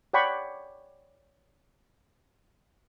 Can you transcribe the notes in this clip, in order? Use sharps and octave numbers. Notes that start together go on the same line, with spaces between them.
C#5 D5 F#5 G5 B5 C#6